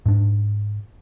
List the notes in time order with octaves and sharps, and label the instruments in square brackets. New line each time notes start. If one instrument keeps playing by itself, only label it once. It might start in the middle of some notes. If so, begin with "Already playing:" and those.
[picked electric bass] G#2 D4